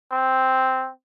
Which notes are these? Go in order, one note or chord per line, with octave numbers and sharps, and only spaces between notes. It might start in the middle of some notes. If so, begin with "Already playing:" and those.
C4